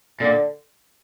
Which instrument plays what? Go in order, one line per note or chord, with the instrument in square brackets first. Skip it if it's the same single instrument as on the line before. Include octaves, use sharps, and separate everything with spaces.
[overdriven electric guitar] A#2 [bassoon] D3